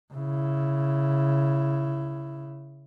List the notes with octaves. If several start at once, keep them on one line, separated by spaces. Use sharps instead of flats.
C#3 E4